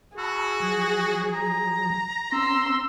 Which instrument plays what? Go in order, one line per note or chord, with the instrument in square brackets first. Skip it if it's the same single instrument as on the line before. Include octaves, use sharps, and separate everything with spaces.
[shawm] F#4 [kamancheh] G#4 [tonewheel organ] A5 B5 E6
[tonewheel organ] F3 F#3
[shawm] A#5
[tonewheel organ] C4 C#4 [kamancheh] C6 E6